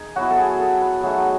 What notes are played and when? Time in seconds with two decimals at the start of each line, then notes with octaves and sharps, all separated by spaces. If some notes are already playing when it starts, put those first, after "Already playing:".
Already playing: D#4 G#4
0.16 F#3 B3 E4 F#4
0.30 A4
0.38 G#4
0.60 A4
0.81 B4
1.03 F#3 A3 D#4 G#4